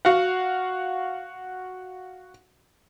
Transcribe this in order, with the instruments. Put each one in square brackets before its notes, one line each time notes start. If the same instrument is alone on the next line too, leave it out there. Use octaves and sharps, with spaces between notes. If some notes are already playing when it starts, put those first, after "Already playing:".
[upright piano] F#4 F5 F#5